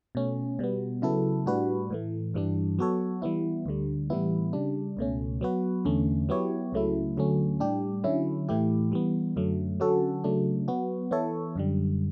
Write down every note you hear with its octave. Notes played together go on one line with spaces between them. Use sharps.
B2 A3 C#4
B2 G3 B3
C#3 F#3 B3 E4 A4
A2 G3 D4 F#4 B4
A2 E3 A3
G2 E3 G3 D4
F#3 B3 F#4 A4 C#5
E3 G3 B3 E4
D2 D3 G3
A2 E3 G3 B3 E4
C#3 G3 D4
C#2 B2 A3 C#4
F#3 B3 F#4 B4
E2 D3 A3 C#4
F#3 B3 E4 G4 C#5
C#2 C#3 F#3 A3 E4
D2 D3 F#3 A3 C#4
A2 G3 D4 G4
D3 F#3 C#4 E4
A2 E3 A3 E4 G4
E3 G3 B3
F#2 D3 F#3 A3
D3 F#3 C#4 F#4 A4
C#3 F#3 A3 D4
F#3 B3 F#4
E3 B3 E4 A4 C#5
F#2 D3 G3